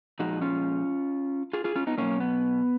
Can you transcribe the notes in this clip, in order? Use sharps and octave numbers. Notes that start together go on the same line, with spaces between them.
A#2 F3 G#3 D#4 F#4
C#4 F4
F4 G#4
F4 G#4
C#4 F4
B3 D#4
B2 F#3 A#3 C#4
B3